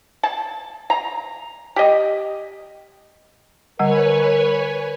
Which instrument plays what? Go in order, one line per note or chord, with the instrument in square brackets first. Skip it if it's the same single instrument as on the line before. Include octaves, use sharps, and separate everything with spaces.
[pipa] A5
A#5
G4 D#5
[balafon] D3 G3 F#5 [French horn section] A#4 [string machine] B4 C#5 G#5